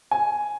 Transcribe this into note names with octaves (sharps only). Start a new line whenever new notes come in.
G#5